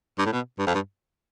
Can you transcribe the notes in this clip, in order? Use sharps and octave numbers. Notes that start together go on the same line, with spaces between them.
G2
A2
B2
G2
F2
G2